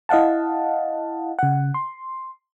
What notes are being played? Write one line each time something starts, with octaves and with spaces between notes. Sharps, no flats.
E4 D#5 F5 F#5 A5
C#3 F#5
C6